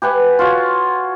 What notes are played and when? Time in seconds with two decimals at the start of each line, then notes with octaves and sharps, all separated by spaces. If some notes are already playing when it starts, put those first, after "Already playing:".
0.02 G4 B4 F#5 G#5
0.39 F4 F#4 C#5